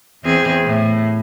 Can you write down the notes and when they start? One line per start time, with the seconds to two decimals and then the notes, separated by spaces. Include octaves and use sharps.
0.23 E2 C4 G#4
0.65 A2